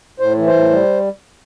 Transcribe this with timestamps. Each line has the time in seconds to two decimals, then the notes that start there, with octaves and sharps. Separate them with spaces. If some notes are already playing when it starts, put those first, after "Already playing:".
0.20 A2 C5
0.37 E3
0.47 C5
0.53 A2
0.71 G3